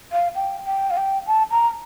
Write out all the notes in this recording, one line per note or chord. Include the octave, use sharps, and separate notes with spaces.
F5
G5
G5
F5
G5
A5
A#5